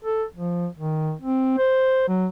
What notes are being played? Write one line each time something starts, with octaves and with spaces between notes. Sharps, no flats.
A4
F3
D#3
C4
C5
F#3